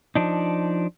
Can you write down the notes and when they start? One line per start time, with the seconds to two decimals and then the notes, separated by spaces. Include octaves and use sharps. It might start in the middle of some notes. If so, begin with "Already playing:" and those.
0.15 F3 D4 D#4